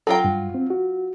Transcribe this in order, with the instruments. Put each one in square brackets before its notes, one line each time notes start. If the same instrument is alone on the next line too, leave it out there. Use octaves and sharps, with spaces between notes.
[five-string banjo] F#3 F4 G5 [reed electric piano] A4 A#5
[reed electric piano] G2
C4
F#4